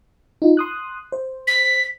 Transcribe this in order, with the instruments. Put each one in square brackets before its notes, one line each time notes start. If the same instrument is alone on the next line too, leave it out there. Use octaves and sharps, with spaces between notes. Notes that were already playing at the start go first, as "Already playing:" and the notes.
[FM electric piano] D#4 F4
C6 D#6 F#6
C5
[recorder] B6